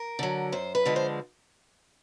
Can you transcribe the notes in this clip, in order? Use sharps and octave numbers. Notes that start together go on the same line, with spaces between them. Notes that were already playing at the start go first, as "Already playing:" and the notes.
Already playing: A#4
D3 F#3
F#2 C5
B4
D3 F3 G#3
C5